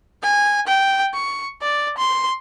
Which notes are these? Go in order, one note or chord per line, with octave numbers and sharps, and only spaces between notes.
G#5
G5
C#6
D5
C6